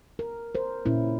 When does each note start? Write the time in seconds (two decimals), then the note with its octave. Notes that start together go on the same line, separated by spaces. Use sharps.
0.19 A#4
0.55 A#4 C5
0.86 A#2 C#4 E4